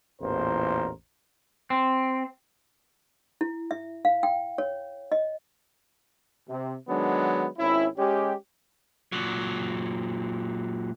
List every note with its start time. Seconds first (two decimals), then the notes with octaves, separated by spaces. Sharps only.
0.21 A1 E2 A#2 A#4 C5
1.70 C4
3.41 E4
3.71 E5
4.05 F5
4.23 G5
4.58 C#5
5.12 D#5
6.49 C3
6.88 D#3 F#3 G#3 B3 D4
7.58 G#1 C#4 E4
7.98 G#3 C#4 G4
9.12 A#2 F#3